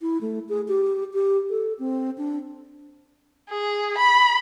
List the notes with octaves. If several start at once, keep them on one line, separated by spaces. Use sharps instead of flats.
E4
A3
G#4
G4
G4
A4
C4
D4
G#4
B5